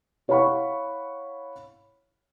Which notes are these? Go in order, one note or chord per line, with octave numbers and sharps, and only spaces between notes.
E4 C#5 F5 F#5 B5 C#6